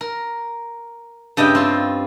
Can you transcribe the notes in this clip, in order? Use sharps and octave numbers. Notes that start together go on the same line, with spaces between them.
A#4
G2 C#3 D#5 E5 G5
C4 F4